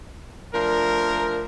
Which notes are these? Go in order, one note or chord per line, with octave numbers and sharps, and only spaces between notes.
F3 A3 D4 A#4